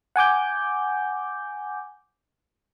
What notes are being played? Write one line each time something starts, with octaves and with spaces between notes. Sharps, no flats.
F#5 G#5 D6 G6